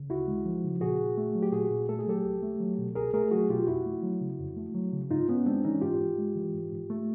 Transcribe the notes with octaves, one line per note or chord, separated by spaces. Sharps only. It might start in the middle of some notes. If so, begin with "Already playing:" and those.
Already playing: C#3
D2 E4 F#4
G#3
F3
C#3
A#2 F#4 G#4
A#2
A3
F#3
G4
A#2 F#4 G#4
A#2
A3 A4
G#4
F#3 G4 A4
C2
A3
F#3
B2
C2 G#4 A#4
A3 G#4 A#4
F#3 F#4 G#4
B2 F4 G4
F2 E4 F#4
A3
F#3
C#3
F2
A3
F#3
C#3
G#2 D#4 F4
G#2 B3 C#4
G#3 C4 D4
E3 C#4 D#4
G#2 F4 G4
G#2
G#3
E3
G#2
G#2
A3